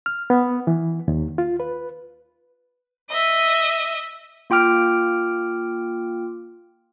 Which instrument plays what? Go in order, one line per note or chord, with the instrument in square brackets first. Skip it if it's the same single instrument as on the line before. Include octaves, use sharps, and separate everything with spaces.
[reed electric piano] F6
B3
E3
D#2
F4
B4
[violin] D#5 E5
[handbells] A#3 F4 G5 D6 F6 D7